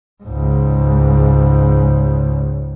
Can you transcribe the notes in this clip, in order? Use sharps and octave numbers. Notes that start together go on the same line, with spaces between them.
C#2 G#2